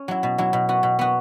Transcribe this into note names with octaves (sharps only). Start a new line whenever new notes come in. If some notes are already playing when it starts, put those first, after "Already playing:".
Already playing: C#4
F#3 E4
B2
F#3 E4
B2
B3 F#4
B2
B3 F#4